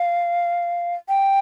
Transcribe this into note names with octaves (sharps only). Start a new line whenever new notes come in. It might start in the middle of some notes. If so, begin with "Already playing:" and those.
Already playing: F5
G5